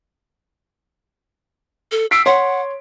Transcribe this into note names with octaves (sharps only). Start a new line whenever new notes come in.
A4
E6 B6 C7 D7
C#5 F#5 C6